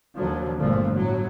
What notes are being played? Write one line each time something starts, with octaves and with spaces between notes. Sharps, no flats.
D#2 D3 F3 F#3
G1 A#2 D3 F3 A3
A2 F#3